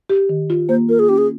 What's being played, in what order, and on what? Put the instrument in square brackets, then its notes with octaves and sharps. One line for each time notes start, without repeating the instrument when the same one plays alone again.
[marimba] G4
D#3
F4
[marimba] A#3 [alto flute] C5
[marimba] F4 [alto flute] A#4
[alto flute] G#4
[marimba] C#4 [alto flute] G4
[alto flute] G#4